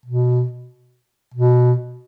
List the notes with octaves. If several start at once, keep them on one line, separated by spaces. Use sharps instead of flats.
B2
B2